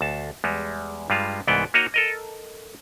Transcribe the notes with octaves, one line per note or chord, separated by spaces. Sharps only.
D2 A5
E2 G3 G#3
G2 G3 G#3 F4
C2 G#2 E3 B3 D5 G5
A#3 D#4 F#4 C#5 D#5 A#5
A4 A#4 D#5